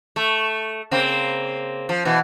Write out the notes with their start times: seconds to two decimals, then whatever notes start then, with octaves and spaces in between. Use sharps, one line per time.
0.16 A3
0.91 C#3 A#3 C4
1.89 F3
2.05 B2 E3